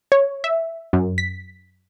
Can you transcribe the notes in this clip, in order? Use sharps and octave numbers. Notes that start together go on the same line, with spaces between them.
C#5
E5
F#2
B6